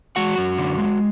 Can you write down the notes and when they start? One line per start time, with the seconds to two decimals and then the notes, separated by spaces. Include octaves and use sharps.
0.16 G#3 F#4 F#5
0.38 F#2
0.58 D3
0.78 G#3